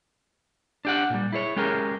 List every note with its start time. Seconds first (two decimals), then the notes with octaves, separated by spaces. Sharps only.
0.85 D4 G4 F#5
1.10 A#2 G3
1.32 E4 G#4 C5 C#5
1.56 G#3 C#4 G4 G#4 A#4